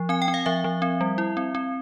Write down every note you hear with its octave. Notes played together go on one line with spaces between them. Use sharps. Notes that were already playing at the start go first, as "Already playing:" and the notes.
Already playing: F3
C4 G#5
G5
C4
F5
F3 E5
F3
C4
G3
E4
C4
C4